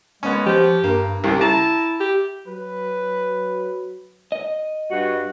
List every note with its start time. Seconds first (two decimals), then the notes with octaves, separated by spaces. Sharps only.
0.23 G#3 B3 C#4
0.46 F3 G4
0.84 G2 A#3
1.24 C2 C#3 G4
1.41 E4 A5 A#5
2.00 G4
2.47 F#3 B4
4.32 D#5
4.90 G2 F#4